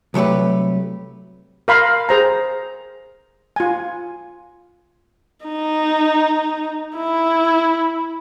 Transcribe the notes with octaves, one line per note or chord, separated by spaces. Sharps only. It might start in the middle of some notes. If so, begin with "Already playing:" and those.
C2 F#3 A3 G4 B4
A#4 F5 B5 C6
G#4 C5 A#5
F4 G#5
D#4
E4